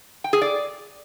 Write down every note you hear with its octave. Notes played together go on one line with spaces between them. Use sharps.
G5
G#4
D5